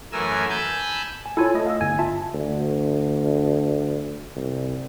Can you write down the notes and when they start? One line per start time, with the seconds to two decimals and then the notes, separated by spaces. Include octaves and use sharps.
0.12 F#2 E3 A3 A#4 G#5 E6
0.50 G#5 A5 B5 E6 G6
1.26 G#5
1.37 E4 F4 A4 C#5 G#5
1.54 A3 D#5
1.67 F5 E6
1.81 G1 G#5
1.99 F4 E5 A5
2.34 D2
4.36 C2